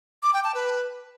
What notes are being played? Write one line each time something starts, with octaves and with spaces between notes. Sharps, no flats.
D6
G5
A5
B4